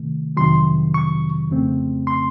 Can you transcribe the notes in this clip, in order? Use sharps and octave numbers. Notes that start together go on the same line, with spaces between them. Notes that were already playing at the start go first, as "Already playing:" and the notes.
Already playing: C3 D#3 A3
F2 C3 D#3 F#3 C6
C#6
F2 C#3 A3 C4
C6